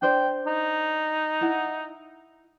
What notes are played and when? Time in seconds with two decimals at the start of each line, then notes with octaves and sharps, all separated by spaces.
0.02 D4 C5 D5 G5
0.47 D#4
1.41 E4 F#5